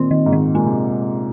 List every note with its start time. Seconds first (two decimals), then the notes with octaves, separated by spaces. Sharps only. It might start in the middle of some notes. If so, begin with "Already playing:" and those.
Already playing: A#2 D#3 C4
0.11 D#3
0.26 G#2
0.33 D#3
0.54 A#2 G#3
0.67 C3